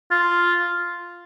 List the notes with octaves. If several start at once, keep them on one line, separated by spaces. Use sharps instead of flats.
F4